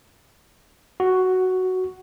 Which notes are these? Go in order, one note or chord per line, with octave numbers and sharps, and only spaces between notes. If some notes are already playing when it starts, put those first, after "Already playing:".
F#4